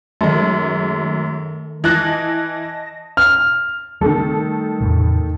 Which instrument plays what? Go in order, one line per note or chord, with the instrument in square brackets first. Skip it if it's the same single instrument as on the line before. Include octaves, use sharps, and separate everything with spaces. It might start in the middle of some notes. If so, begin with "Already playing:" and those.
[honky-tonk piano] F#2 G#3 [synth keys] D#3 A3
[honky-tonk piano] E3 F#6 [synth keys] D#5 A5 A#6
[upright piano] F6
[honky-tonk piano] D#3 A4 [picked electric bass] G3 A3
[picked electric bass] E2 A2 C3